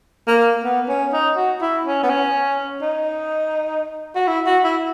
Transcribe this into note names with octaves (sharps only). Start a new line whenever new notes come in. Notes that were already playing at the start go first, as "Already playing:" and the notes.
A#3
B3
C#4
D#4
F#4
E4
C#4
B3
C#4
D#4
F#4
E4
F#4
E4